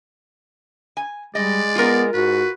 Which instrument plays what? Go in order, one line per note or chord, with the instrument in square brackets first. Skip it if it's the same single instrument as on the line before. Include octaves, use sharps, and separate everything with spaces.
[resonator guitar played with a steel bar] G#5
[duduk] G3 [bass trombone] G#3 [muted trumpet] D5 [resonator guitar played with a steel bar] D#5
[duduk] B3 [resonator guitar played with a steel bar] F4 A#4
[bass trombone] G#2 [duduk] F#4 [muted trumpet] B4